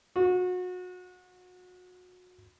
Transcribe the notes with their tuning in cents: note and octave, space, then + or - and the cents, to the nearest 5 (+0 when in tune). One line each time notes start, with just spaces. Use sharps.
F#4 -30